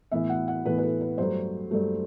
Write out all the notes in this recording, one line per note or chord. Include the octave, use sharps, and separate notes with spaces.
A2 E3 B3 E5
F#5
F#5
A2 E3 B3 B4
B4
A4
B4
G2 F#3 A3 C5
G2 F#3 A3